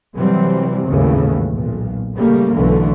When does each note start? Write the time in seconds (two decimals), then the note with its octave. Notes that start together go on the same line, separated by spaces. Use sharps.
0.15 C3 E3 F#3 G3 C4
0.86 G#1 D#2 A2 C#3 E3
1.53 B1 A#2
2.15 C#3 G3 A3 A#3
2.53 B1 D3 E3 A3